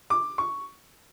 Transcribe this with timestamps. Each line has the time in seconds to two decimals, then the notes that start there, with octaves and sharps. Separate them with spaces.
0.10 D6
0.38 C#6